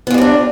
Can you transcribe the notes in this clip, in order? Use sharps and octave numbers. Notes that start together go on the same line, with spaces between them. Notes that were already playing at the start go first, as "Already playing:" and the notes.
G3 B3 C4 D4 F4